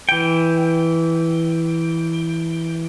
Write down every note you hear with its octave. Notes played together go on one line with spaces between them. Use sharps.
E3 G5